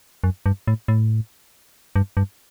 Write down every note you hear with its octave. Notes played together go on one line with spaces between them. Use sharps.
F#2
G2
A2
A2
G2
G2